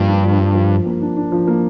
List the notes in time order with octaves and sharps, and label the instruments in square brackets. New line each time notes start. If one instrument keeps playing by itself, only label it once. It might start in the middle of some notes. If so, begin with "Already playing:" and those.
Already playing: [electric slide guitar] G2 [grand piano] F3 A#3
[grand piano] D4
F3
F3
F3
F3
A#3
D4
D4
F3
A#3